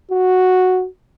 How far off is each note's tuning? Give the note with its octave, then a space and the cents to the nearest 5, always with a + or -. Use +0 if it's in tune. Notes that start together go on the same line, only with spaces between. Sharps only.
F#4 -5